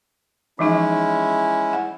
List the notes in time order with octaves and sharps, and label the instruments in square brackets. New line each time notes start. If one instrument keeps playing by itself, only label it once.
[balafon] E3 F3 D#4 [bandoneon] G#3 C#4 E4
[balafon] F#5